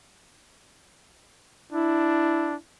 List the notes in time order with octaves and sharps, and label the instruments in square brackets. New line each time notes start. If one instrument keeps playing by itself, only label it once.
[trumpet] D4 [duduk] E4